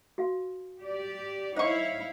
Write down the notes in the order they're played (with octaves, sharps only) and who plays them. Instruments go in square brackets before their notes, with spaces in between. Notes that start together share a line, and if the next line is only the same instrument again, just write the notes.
[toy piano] F#4 F5
[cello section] G4 D5
[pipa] D#4 C#6 [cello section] E4 C#5 F5 [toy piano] C5